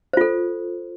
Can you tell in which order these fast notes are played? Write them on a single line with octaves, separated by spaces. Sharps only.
C5 F4 A4